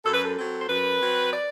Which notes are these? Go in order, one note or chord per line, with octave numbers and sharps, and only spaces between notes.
F#2 A4
B4
A4
F#3 C4
C5
F#2 B4
F#3 C4
D5